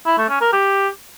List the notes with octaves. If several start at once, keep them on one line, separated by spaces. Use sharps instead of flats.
E4
A3
C#4
A#4
G4